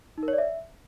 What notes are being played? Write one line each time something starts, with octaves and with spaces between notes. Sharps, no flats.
D#4
A#4
C#5
D5
E5